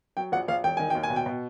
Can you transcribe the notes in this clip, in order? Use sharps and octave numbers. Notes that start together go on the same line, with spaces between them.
F#3 G5
A#1 F#5
A#1 F5
E1 G5
D#3 G#5
D#2 G5
G#5
B2
G5
B2